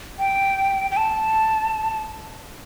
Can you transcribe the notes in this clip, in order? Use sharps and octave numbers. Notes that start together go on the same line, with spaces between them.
G5
G5
A5